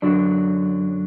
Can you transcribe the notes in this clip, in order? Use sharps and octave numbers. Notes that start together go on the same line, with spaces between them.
F#2 D3 F#3 D4